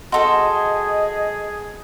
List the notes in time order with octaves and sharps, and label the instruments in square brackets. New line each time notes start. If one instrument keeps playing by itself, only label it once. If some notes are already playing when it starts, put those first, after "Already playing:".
[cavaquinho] F#4 A4 C5 [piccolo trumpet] G#4 [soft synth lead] D#5 [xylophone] C6